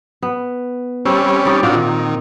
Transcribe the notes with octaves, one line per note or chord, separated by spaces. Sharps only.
B3
G3 C4 C#4 A4
D#4 G4 D5
A#2 D4 F4 F#4
D#3